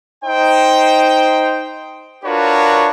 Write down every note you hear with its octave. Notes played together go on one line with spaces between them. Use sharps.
D#4 C5 G5
D4 F4 F#4 A#4 B4 C#5